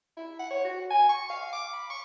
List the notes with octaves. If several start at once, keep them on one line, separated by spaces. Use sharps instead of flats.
E4
F#5
C#5
F#4
G#5
C#6
F5
D6
B5
C#6